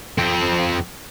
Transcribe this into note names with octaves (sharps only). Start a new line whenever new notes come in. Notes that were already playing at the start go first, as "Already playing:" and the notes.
F2 C4